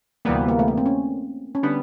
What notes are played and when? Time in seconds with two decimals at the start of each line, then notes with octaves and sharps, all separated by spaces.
0.25 D2 C3 E3 G3 A#3 B3
0.48 A#3
0.59 A3
0.68 A#3
0.78 C4
0.86 C#4
1.55 C#4
1.63 D3 G3 B3 D4